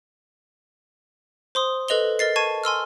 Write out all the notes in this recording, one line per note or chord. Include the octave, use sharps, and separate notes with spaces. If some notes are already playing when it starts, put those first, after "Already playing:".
C5 C6 D#6
A4 B4 D#5 F7 G7
A#4 D#5 A6 C7
A5 C#6 G#6 D#7
G#5 C6 E6 F6